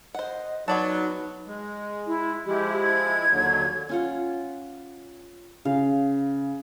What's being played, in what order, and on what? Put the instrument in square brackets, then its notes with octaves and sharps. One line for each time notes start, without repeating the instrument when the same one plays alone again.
[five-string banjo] C5 F#5 [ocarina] D#5
[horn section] F#3 [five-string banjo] B3 D5 A5 [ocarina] D#4
[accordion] G#3
[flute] E4
[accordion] F3 G#3 E4 [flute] G4
[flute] G#6
[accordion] D#2 D3 F#3
[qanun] C#4 F4 F#5
[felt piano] C#3 [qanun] F5